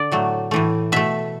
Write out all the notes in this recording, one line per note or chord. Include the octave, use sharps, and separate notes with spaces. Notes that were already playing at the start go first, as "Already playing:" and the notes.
Already playing: D3 D5
A2 F#3 A3
A2 E3 A3
B2 A3 E5